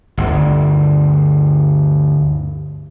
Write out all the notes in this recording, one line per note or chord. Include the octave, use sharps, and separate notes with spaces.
G1 D2